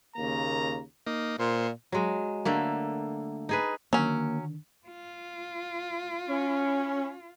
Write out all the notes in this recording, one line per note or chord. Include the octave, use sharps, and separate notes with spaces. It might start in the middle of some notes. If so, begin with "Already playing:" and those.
D#2 C#3 A#3 A#5
A#3 D#4
A#2 C5
F#3 G#3
D3 A3 A#3
D#4 G#4 B4
D3 D#3 F#3 A#3 C#4 D4
F4
C#4